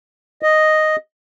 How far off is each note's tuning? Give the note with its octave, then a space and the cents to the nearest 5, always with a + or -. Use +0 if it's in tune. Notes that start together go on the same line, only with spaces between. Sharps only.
D#5 -5